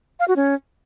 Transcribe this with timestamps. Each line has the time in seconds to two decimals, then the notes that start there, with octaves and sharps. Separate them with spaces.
0.20 F5
0.28 F#4
0.36 C#4